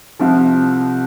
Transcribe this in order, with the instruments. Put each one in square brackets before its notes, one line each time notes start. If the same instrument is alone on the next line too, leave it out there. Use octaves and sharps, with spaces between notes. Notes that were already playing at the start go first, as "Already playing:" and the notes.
[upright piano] C2 C3 F3